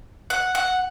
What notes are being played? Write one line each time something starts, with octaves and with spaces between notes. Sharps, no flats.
F#5
F#5